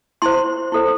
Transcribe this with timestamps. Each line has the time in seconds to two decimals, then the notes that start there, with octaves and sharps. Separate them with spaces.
0.22 E4 C5 C6
0.72 E4 A4 C5